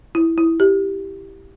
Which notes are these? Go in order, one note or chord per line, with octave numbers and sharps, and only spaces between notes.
E4
E4
G4